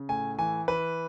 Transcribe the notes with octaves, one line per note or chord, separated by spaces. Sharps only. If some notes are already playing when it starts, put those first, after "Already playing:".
Already playing: C#3
A2 G#5
E3 G#5
E3 B4